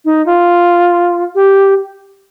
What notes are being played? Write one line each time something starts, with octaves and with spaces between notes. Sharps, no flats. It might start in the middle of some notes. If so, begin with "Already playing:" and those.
D#4
F4
G4